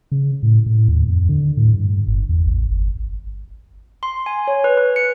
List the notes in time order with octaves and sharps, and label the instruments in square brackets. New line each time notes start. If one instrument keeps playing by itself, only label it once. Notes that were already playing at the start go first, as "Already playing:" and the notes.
[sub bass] C#3
A2
A2
D#2
F2
D3
A2
G2
G1
E2
A1
G1
[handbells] C6
G#5
C#5
B4
B4
C#7